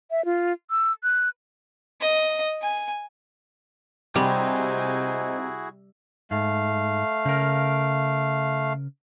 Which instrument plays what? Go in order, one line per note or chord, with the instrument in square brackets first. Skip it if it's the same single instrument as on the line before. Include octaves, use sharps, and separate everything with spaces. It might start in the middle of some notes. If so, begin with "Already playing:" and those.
[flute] E5
F4
E6
F#6
[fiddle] D#5
G#5
[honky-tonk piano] C3 [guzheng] G3 [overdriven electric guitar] D#4 C5 [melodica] E4 F#4 G#4
[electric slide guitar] G#2 [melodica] A3 F5
[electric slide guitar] C#3 A#4